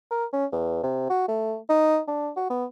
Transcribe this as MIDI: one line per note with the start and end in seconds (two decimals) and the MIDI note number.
0.11 0.25 70
0.33 0.45 61
0.52 0.79 40
0.83 1.10 48
1.10 1.26 66
1.28 1.56 57
1.69 1.99 63
2.08 2.30 62
2.37 2.45 66
2.50 2.65 59